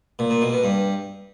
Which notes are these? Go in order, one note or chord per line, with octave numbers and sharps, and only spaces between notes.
A#2
A#2
B2
B2
G2